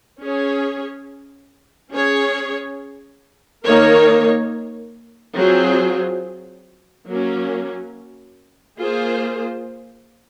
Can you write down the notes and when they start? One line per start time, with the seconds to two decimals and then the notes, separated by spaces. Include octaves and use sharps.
0.20 C#4 G#4 C#5
1.92 C#4 G#4 C#5
3.64 D#3 A#3 D#4 A#4 C#5
5.36 F#3 C4 F4 G#4 C5
7.07 F#3 A#3 C#4
8.79 A#3 F4 G#4 C5